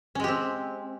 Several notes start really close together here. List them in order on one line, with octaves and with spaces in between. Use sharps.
C#4 G#3 G4 C4